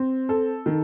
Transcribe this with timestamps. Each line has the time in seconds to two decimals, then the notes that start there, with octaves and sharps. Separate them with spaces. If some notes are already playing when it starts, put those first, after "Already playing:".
Already playing: C4
0.29 A4
0.66 D#3